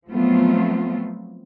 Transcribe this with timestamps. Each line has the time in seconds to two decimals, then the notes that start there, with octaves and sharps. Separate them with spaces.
0.10 F3 F#3 A3 B3 C4 F4